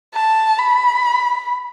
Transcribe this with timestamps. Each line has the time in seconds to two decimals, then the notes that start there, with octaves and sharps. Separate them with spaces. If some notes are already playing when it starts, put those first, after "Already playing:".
0.14 A5
0.58 B5